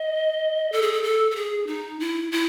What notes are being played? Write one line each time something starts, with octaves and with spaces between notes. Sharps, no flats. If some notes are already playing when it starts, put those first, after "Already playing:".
Already playing: D#5
A4
G#4
A4
A4
A4
G#4
D#4
E4
E4